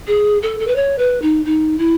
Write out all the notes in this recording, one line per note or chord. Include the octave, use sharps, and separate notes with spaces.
G#4
A4
A4
B4
C#5
B4
D#4
D#4
E4